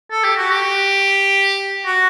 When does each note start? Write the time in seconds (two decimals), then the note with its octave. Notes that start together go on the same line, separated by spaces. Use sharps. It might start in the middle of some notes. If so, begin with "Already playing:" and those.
0.11 A4
0.24 G4
0.37 F#4
0.51 G4
1.85 F#4